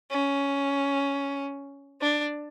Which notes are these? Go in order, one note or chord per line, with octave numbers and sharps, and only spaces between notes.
C#4
D4